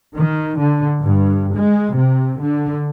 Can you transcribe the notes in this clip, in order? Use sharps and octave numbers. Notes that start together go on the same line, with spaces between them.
D#3
D3
G2
G#3
C3
D3